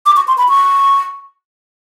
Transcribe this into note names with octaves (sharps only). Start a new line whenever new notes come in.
D6
C#6
C6
B5
C#6